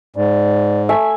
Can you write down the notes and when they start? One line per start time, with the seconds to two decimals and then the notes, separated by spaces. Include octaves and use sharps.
0.16 G#2 D5
0.89 A3 E5 G#5